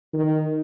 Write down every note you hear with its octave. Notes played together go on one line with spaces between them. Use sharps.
D#3